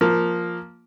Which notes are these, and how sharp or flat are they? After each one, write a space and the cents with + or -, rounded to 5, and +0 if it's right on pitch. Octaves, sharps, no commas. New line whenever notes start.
F3 +0 A#3 +0